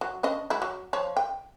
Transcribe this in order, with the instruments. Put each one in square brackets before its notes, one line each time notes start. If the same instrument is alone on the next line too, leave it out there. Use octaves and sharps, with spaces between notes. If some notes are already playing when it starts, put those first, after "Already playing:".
[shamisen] F#3
C#4 D4 D#5
F#3 G#3 E4
F#3
F3 C#5
G5